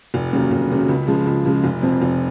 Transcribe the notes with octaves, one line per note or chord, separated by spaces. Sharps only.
F1
D#2 C#3 F#3
F1
D#2 C#3 F#3
C#2
C#3 F3 G#3
C#2
C#3 F3 G#3
F1
F2 C3 F3 C4
F1